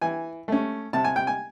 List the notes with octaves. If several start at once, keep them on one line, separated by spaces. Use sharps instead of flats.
E3 G#5
A3 C#4
C3 A5
G#5
G5
G#5